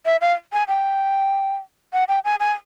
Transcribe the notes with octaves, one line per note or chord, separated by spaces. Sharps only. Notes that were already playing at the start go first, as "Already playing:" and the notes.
E5
F5
G#5
G5
F#5
G5
G#5
G#5